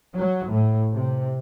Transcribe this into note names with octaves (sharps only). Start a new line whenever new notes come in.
F#3
A2
C3